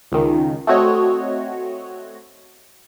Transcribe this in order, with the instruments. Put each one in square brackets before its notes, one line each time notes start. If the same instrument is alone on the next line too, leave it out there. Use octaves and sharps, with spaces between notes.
[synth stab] C#2 D#3
A3 C4 F#4 C#5 D#5